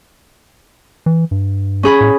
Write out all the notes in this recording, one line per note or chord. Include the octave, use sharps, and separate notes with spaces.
E3
G2
C#4 G#4 B5
A2